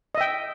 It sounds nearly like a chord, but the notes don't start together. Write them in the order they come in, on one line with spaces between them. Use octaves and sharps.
D#5 E5 G5